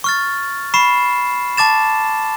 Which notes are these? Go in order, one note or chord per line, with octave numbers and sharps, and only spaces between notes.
C#6 F6 A6
B5 C#6 C7 E7
A5 D6 A6 E7